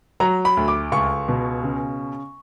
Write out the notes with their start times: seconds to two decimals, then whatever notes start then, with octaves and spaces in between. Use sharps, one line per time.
0.20 F#3 A#5
0.45 B5
0.57 D2
0.68 D6
0.92 C#2 C#6
1.28 B2
1.63 C#3